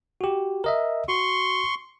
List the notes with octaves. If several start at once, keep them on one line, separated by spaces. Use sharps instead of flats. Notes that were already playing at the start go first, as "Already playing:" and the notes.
F#4 G4
A#4 D#5 E5
F#4 C6 C#6